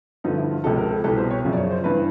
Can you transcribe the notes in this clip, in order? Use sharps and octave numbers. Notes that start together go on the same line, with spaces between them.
G2 D3 F3 D#4
E4
F4
C#2 C3 F3 A4
A#4
A4
C2 B2 A4
C5
C#5
F#2 C#3 F3
D5
C#5
C5
G2 E3 B4